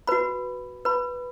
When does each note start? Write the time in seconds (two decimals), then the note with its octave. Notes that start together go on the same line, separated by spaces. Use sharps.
0.07 F#4 B4 B5
0.85 B4 B5